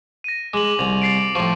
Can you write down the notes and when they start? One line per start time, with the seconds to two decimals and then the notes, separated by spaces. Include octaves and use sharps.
0.24 A#6 D#7
0.54 G#3 D6 F#7
0.79 C2 F7
1.02 A6 C7 D7
1.35 A2 F3 C#6